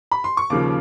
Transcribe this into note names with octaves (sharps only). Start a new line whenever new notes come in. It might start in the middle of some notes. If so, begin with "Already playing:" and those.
B5
C6
C#6
D#2 C#3 F3 D6